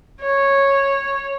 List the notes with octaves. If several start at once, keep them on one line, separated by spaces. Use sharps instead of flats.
C#5